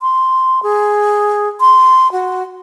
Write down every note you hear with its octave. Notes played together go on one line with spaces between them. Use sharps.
C6
G#4
C6
F#4